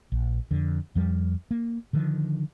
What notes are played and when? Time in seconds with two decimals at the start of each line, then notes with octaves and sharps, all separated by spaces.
0.12 A#1
0.51 F2 D3
0.95 F2 F3 G3
1.51 A#3
1.93 D3 D#3 F3